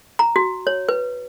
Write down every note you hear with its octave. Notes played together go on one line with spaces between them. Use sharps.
A#5
F#4
C#5
B4